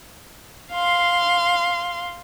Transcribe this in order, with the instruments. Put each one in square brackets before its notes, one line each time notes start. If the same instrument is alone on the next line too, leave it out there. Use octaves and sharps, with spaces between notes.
[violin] F5 C6